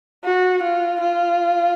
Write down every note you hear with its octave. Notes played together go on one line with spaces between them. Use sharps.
F#4
F4
F4